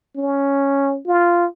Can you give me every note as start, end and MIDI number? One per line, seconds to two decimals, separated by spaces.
0.16 0.99 61
1.06 1.46 65